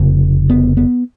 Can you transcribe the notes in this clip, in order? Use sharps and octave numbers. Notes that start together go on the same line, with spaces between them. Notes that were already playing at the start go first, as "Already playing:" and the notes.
Already playing: F1 F2 C#3 A#3
B3
B3